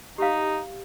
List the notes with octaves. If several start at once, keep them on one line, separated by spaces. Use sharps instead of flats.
D#4 G4 F5